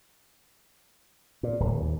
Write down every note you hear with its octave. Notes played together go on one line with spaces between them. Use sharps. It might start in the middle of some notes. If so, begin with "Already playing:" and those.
A#2
D1
D#2